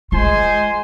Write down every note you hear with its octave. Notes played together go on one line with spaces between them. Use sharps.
G#3 F4 C5 G#5 C6